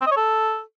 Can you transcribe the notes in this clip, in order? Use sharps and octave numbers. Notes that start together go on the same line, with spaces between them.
C4
D#5
C#5
A4